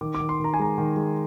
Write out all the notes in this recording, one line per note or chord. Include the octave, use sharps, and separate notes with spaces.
D#3 D6
D6
D#3
C6
D#3 A#5
G#5
G#3 A#5
D#3
G#3